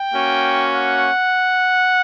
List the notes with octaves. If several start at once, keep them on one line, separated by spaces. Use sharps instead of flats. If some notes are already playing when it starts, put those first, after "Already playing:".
Already playing: G5
A#3 C#4 F#4
F#5